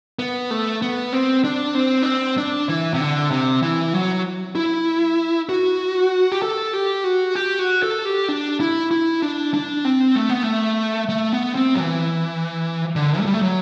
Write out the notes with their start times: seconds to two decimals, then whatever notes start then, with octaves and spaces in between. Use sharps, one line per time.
0.19 B3
0.51 A3
0.82 B3
1.13 C4
1.44 D4
1.75 C4
2.02 D4
2.06 C4
2.38 D4
2.69 E3
2.94 C3
3.00 D3
3.31 C3
3.63 E3
3.93 F#3
4.55 E4
5.49 F#4
6.32 G4
6.42 A4
6.73 G4
7.04 F#4
7.35 G4
7.59 F#4
7.83 A4
8.05 G4
8.28 D4
8.60 E4
8.91 E4
9.22 D4
9.54 D4
9.85 C4
10.16 A3
10.29 B3
10.43 A3
11.09 A3
11.32 B3
11.55 C4
11.75 F#3
11.80 E3
12.96 D3
13.20 A3
13.26 G3
13.34 A3
13.42 F#3